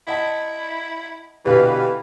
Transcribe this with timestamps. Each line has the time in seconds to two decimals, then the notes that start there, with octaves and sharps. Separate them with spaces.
0.08 E4 D#5 F#5 A5
1.45 B2 D3 E3 G4 B4 F5